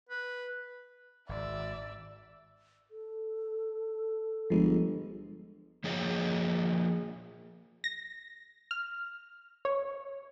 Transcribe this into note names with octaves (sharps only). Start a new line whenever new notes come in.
B4
G#1 D5 E5 E6
A4
G1 F3 G#3
F3 A#3 G#4 C#5 D#5
A#6
F6
C#5